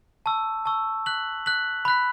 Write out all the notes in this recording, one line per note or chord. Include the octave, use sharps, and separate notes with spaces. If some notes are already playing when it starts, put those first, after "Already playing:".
A5 C#6 E6
A5 C#6 E6
F#6 B6 F#7
F#6 B6 F#7
B5 F#6 B6